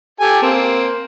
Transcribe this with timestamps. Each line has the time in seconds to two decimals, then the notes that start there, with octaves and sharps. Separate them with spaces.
0.20 G4 A4 G#5
0.42 A#3 C4